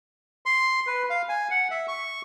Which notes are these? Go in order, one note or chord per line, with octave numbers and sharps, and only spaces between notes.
C6
B4
F5
G#5
F#5
E5
C#6